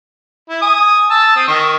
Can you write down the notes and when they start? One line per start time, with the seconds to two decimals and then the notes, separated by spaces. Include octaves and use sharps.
0.49 E4
0.62 G#5 D#6
1.10 A5 E6
1.36 C4 D#6
1.48 D#3 C#6